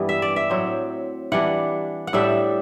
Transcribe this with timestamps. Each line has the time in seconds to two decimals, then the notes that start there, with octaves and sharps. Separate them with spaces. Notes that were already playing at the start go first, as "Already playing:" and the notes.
Already playing: G2 E3 G3 B3
0.09 E5
0.22 D5
0.36 E5
0.50 A2 F#3 C4
1.32 E3 G3 D4 F#5
2.07 F#5
2.13 A2 G3 D4 E5